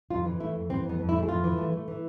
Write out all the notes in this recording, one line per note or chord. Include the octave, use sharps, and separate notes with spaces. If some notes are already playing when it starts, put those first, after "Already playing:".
F2 F4
E3
A3 E4
F2
E3 C4
F2 B3
F2
E4
A3
G#4
F2 F4
E3
A3
A3
E3